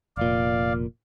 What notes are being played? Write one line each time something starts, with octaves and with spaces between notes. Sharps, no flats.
F1 A#2 D5 F5